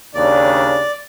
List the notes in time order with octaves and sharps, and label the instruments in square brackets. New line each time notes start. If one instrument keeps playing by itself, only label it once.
[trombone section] D#2 C#3 D4 [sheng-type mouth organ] D5